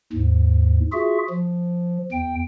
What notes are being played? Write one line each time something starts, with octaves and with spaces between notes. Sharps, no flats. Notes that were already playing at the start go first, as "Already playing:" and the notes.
D#2 G#2
F4 F#4 G#4 E5
F3
E2 G5